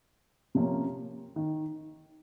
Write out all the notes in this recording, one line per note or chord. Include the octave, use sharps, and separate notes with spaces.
C3 F3 A#3 C#4
D#3